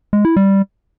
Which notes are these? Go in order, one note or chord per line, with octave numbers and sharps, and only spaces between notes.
G#3
E4
G3